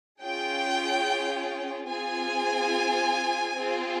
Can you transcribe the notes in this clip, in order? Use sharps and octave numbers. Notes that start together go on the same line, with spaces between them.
C#4 F4 G#4 G5
C4 F4 G#4 G#5
C4 F4 G#4